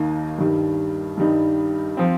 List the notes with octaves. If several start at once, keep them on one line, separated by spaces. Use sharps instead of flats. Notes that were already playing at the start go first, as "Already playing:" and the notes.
Already playing: D#2 D#3 A#3 D#4
G2 D#3 G3
G2 D#3 G3 D#4
F3 C4